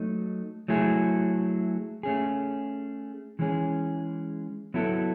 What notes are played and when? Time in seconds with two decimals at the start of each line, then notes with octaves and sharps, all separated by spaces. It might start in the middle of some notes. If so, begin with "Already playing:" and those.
Already playing: F#3 A3 D#4 A4
0.68 F#3 A3 E4 G#4
2.03 A3 C#4 G#4
3.39 E3 G#3 C#4 G#4
4.74 F#3 B3 E4 A4